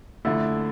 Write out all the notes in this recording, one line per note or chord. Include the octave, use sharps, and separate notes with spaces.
F2 D3 A3 E4